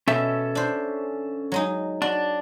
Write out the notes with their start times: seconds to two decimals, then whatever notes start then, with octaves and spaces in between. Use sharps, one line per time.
0.08 B2 C#4 A4 E5
0.55 D4 C5
1.52 F#3 G#3 D#4
2.02 D4 F#4